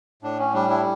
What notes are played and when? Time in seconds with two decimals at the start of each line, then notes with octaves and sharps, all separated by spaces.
0.22 A2 D4
0.39 C#4
0.54 G3 D4
0.69 D4 E4